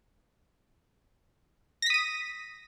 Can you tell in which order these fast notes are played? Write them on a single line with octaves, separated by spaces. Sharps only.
A#6 B6 D#6 D#7